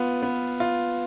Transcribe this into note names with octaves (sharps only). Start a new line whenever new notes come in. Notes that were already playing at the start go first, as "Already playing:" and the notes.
Already playing: B3 F4
B3
F4